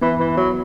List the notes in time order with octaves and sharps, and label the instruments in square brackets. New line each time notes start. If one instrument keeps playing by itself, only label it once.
[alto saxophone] E3 [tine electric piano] B3
[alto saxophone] E3
F#3